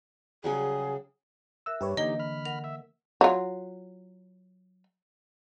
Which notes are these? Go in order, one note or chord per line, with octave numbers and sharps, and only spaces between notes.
C#3 F#3 G3 G#4
A#4 E5 E6 F#6
G2 G4 B4 C#5
D3 E3 A#3 D#4 G4 D#5 G7
B5 F6
A#4 F#5 F7
E5
F#3 F4